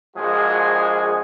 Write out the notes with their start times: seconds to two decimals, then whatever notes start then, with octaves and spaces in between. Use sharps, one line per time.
0.16 A#1 F3 G#3 F#4 G#4